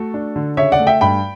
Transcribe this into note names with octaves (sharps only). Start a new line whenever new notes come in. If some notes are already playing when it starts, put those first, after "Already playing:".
Already playing: A3 F#4 A4
D4
D3
C#3 C#5 E5
D5 F#5
A3
E5 G5
G2 G5 B5